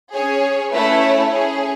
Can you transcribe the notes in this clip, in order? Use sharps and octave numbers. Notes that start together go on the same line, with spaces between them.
C#4 G#4 C#5
A3 C#4 E4 A4 B4
C#5
C#4 G#4